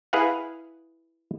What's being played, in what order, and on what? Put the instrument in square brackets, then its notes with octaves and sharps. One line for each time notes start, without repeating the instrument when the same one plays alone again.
[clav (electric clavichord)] E4 G#4 B4 F5 F#5